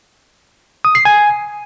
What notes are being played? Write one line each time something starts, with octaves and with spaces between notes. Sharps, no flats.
D#6
C7
G#5